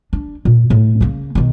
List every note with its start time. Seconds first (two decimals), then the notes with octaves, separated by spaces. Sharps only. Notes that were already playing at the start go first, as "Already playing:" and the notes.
0.13 D4
0.45 A#2
0.70 A2
1.01 C#3 A#3
1.35 B1 D#3